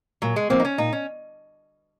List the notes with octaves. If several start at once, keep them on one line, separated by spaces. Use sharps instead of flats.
A#2 F#3
G#3
F3 A#3 C4
D#4
C#4
A#2 D#4
C#4